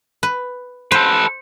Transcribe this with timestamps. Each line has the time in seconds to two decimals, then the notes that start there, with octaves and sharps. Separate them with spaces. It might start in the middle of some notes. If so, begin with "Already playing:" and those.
0.23 B4
0.92 A4 B4 C5